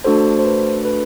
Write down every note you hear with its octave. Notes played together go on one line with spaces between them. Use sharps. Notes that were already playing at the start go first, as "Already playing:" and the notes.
A3 D4 F#4 A4 C5
C5
B4
B4